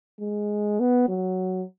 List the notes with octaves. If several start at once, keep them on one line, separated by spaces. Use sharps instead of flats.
G#3
B3
F#3